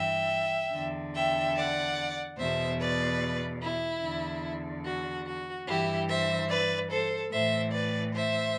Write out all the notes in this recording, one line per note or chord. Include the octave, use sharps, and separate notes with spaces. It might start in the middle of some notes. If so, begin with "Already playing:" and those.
Already playing: G2 E3 E5 G5
E2 D3
E5 G5
D5 F#5
E2 B2 C5 E5
B4 D5
E4
E2 D3
F#4
F#4
G2 E3 E4 G4
C5 E5
B4 D5
A4 C5
A2 E3 C5 E5
B4 D5
C5 E5